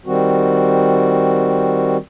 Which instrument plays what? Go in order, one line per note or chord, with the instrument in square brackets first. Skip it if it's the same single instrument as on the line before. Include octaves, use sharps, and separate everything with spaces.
[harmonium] D#3 G3 C4 F#4